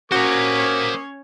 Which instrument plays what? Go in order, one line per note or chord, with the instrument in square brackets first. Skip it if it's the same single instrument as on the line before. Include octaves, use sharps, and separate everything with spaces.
[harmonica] A#3 D6 D#6 [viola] C#4 C#5 [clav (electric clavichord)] F#4 [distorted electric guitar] C5 A#5